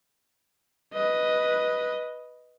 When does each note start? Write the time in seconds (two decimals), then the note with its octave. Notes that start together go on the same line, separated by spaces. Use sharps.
0.93 B4 D#5